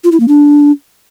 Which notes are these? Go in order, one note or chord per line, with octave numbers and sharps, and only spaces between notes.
F4
E4
A#3
D4